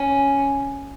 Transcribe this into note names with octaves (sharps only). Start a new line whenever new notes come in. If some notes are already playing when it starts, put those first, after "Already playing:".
Already playing: C#4